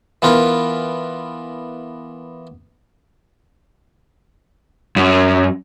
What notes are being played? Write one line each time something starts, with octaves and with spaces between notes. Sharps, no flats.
E3 B3 F4 A#4
F#2